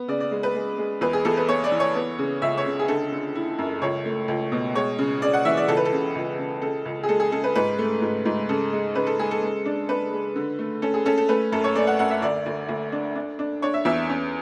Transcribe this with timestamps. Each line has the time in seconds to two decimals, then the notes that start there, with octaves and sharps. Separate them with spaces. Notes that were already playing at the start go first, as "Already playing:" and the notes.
Already playing: B3
0.08 C#3 D5
0.20 D5
0.31 G#3
0.43 B4
0.55 G#3
0.78 G#3
1.01 E2 B4
1.13 G#4
1.25 E2 A4
1.37 B4
1.49 B3 C#5
1.64 D5
1.72 E3
1.80 C#5
1.95 B3
2.18 C#3
2.42 C#2 E5
2.58 C#5
2.66 C#3
2.79 G#4
2.88 D3 A4
3.12 D3
3.35 E4
3.58 F#2
3.82 C#2 C#5
4.05 A3
4.28 C#2
4.52 B2
4.75 G#3 C#5
4.99 C#3
5.22 C#3 D5
5.33 F#5
5.45 E3 E5
5.57 D5
5.68 C#2 A4
5.77 B4
5.85 A4
5.92 C#3
6.15 C#2
6.39 C#3
6.62 C#3 A4
6.86 C#2
7.03 G#4
7.09 G#3 A4
7.20 G#4
7.32 C#3 A4
7.44 B4
7.55 G#2 B4
7.79 A3
8.02 G#2
8.25 G#2
8.49 C#3 A4
8.72 G#3
8.95 C#3 B4
9.07 A4
9.19 G#3 G#4
9.31 A4
9.42 G#3
9.66 D4
9.89 D4 B4
10.12 G#3
10.36 D3
10.59 A3
10.82 C#4 A4
10.94 G#4
11.05 C#4 A4
11.17 A4
11.29 A3 B4
11.52 F#2 A4
11.64 C#5
11.75 A3 D5
11.87 F#5
11.99 F#2 F#5
12.10 E5
12.22 D2 D5
12.46 D2
12.69 D2
12.92 D4
13.16 D4
13.39 D4
13.62 D4 C#5
13.74 E5
13.85 E2 E5
14.09 C#4